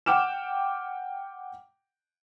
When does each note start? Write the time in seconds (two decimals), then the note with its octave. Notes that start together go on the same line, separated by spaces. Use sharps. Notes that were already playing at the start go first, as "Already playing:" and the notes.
0.06 F#5 G5 D6 F6 E7